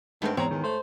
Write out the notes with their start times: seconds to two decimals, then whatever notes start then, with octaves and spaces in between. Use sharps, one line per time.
0.22 G2 D#3 G#3 A3 B3 C4
0.37 E2 G#2 C4 C#5 A#5
0.51 E2 D#3
0.64 A3 C5